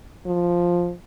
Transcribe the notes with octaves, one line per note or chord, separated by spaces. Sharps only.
F3